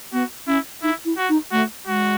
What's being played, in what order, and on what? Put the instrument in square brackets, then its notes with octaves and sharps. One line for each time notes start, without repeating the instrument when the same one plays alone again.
[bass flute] B3 [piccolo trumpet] F#4
[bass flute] C#4 [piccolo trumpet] E4
[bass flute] D#4 [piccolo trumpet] E4
[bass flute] E4
[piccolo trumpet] F#4
[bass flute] D#4
[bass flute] A3 [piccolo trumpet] F#4
[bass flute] G#3 [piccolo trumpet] F#4